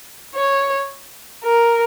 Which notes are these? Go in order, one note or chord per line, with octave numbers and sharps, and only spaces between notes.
C#5
A#4